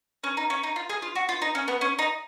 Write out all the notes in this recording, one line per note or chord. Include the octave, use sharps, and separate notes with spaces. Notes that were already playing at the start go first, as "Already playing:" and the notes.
C#4
D#4
C#4
D#4
F4
G#4
F4
F#4
F4
D#4
C#4
B3
C#4
D#4